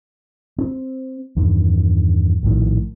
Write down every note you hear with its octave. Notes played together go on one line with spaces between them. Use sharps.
C4
E2 G2 D#3
A#1 A2 D#3